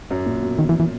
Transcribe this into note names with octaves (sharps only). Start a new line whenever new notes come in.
F#2
A#2
B2
D#3
E3
E3